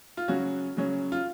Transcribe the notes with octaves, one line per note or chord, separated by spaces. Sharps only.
F4
C#3 F#3 C#4 F#4
C#3 F#3 C#4
F4